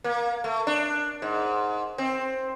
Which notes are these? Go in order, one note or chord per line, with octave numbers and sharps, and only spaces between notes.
A#3
A3
D4
G#2
C4